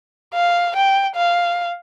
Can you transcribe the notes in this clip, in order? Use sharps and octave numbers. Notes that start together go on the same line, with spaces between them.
F5
G5
F5